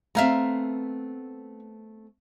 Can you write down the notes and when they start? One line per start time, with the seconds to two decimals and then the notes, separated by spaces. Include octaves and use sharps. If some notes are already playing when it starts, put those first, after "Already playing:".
0.15 A3 B3 C4 E5 F5 A#5